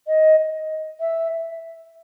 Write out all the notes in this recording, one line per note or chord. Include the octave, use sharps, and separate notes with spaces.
D#5
E5